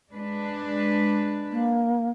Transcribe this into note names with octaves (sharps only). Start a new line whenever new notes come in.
G#3 D4 B4
A#3